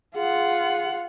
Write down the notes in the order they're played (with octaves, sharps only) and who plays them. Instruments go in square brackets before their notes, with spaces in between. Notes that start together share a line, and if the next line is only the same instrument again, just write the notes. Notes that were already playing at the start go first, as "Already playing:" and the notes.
[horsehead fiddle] F4 F#5 [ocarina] G#4